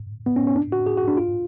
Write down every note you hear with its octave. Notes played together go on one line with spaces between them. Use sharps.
B3
C#4
C#4
D4
F#4
G#4
F#4
D4
F4